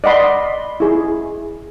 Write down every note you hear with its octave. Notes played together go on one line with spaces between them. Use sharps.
D5 D#5 F#5 B5 C6
E4 G#4